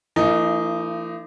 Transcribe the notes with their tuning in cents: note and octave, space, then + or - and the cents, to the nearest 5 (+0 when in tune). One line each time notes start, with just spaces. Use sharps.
E3 +45 A#3 -45 D#4 +0